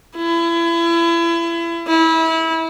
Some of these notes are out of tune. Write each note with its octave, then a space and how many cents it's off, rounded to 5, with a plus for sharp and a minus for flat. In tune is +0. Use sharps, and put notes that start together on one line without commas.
E4 +30
E4 -25